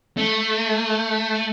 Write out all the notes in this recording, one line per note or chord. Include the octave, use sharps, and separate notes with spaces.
A3